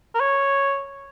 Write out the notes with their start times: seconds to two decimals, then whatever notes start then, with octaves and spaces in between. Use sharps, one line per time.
0.15 A#4
0.20 C#5